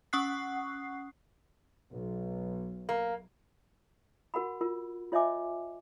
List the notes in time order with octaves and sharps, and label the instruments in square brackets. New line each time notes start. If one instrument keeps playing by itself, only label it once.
[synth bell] C#4 F#5 C#6 D#6 F#6 C7
[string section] B1
[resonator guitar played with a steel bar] A#3
[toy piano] F#4 A#4 F#5 B5
F4 A#4
F4 C#5 D#5 E5 G#5 D6